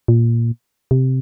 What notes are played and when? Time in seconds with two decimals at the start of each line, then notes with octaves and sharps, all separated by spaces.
0.08 A#2
0.91 C3